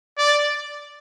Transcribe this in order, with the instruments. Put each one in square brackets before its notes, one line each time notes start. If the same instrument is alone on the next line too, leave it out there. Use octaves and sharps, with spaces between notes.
[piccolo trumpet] D5